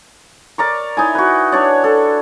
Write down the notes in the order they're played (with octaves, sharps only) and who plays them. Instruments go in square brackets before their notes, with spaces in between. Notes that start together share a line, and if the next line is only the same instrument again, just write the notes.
[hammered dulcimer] A#4 D5 A#5 C#6
D#4 E4 G#5
F#4 B4
D4 C#5 D5
A4